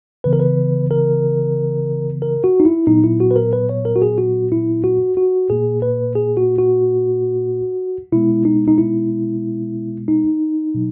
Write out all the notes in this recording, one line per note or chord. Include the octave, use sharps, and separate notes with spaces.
C#3 E3 B3 B4
A#4
B4
A#4
A#4
F#4
D#4
E4
A#2 F#3 B3 D#4
E4
F#4
B4
A#4
B4
C#5
A#4
F#4
G#4
F#4
E4
F#4
F#4
A#2 A#3 G#4
B4
G#4
F#4
F#4
B2 G#3 B3 E4
D#4
D#4
E4
D#4
B2 F#3